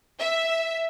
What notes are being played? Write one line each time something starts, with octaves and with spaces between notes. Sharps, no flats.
E5